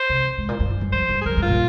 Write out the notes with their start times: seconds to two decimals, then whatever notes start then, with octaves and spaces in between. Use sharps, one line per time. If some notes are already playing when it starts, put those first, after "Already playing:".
Already playing: C5
0.10 C3
0.38 G#2
0.48 A#2
0.60 G2
0.70 G2
0.81 G2
0.92 F2 C5
1.09 G2
1.22 G#4
1.26 F2 A#4
1.37 G2
1.42 F4
1.48 A#2